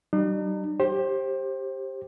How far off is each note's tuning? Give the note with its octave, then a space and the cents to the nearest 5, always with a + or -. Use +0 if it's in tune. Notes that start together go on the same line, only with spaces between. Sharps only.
G3 -40 D#4 -45
G4 +0 C5 +25